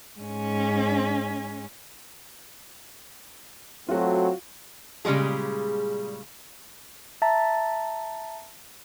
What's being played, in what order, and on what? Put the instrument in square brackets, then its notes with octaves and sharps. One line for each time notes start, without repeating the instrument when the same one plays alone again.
[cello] G#2 C#4
[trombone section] F#3 A3 C4 [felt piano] F4 F#4
[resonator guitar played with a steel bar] A#2 C#3 G3 G#3 G#4
[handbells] E5 A5 A#5 A6